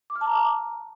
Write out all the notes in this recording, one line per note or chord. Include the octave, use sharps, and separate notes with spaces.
D6
F6
A5
A#5
D6